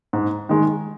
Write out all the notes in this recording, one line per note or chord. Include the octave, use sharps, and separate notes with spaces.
G#2
D#3 G#3